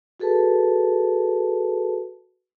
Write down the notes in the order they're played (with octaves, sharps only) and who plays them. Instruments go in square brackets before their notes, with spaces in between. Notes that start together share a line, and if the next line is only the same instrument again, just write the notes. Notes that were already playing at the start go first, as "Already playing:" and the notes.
[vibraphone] F#4 G#4 A4 B4 A5